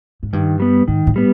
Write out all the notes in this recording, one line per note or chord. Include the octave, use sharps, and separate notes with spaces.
G#2
G2 D#3
G3 B3
G#2 D#3
A2
G3 B3